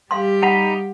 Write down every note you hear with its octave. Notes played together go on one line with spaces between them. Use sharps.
G3 G4 F5 C6
D#4 F#5 A#5 B5